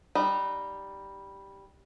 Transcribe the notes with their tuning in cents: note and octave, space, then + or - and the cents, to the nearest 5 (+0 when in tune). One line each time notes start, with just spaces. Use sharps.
G3 +0 D#4 -20